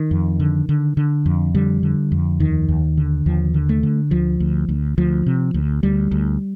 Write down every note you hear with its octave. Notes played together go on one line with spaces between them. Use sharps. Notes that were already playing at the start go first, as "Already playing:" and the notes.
Already playing: D#3
F2
D3
D3
D3
F2
D3 G3
D3
F2
D#2 D#3
D#2
D3
D#2 F3
D3
A3
D3
D2 F3
D2
D2
D2 F3
C3
D2
D2 G3
D2